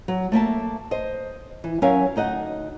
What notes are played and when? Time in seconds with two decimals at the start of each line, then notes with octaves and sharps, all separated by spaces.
0.08 F#3
0.32 A3 A#3 E5 A5
0.91 C5 D#5
1.64 E3
1.82 F#3 C#4 A#4 E5 F5 G#5
2.16 D2 D#4 D#5 F#5